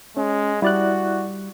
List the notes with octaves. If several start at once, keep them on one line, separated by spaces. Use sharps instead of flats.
G#3 C#4
G3 E4 F#4 D5 F#6